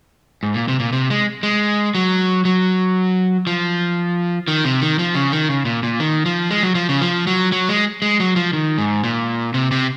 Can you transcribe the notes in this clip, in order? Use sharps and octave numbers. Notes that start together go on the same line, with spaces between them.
G#2
A#2
C3
A#2
C3
G#3
G#3
F#3
F#3
F3
D#3
C3
D#3
F3
C#3
D#3
C#3
A#2
A#2
D#3
F3
G#3
F#3
F3
C#3
F3
F#3
F#3
G#3
G#3
F#3
F3
D#3
G#2
A#2
C3
C3